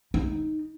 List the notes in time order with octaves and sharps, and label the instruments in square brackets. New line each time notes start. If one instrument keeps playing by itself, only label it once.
[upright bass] D#4